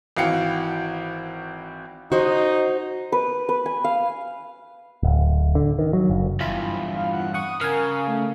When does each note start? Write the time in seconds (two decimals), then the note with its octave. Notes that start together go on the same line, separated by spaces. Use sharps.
0.17 G#1 E3 F#4 F5 G5 C#7
2.12 D#4 F#4 C5 D#5
3.12 B4
3.49 B4
3.66 G#5
3.84 F5
5.03 D1
5.55 D3
5.79 D#3
5.93 F#3
6.10 F#1
6.40 E2 G2 E4 F4 B5
6.94 F5
7.13 F#5
7.34 F#5 C#6 D#6
7.61 C#3 A#4 F5 G#5
8.07 A3